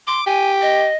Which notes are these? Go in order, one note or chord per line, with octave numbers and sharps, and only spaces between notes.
C6 D6
G4 G#5
D#5